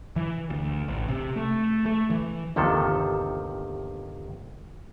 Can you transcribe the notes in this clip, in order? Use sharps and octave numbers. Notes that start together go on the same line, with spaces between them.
E3
D2
A1
C3
A3
A3
E3
G1 D#2 C3 D#3 F3 A4